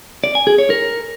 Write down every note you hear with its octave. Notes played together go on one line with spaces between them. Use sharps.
D5
G#5
G#4
C#5
A#4